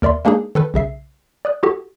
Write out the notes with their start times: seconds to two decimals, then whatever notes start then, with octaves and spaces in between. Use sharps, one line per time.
0.02 D#2 A#4 D5 E5 C6
0.25 G#3 A#3 D4 D#4 G#4
0.55 D#3 A4 B4
0.74 B1 C#3 E5 C7
1.45 D5 D#6 F#6
1.63 E4 F#4 G4 A4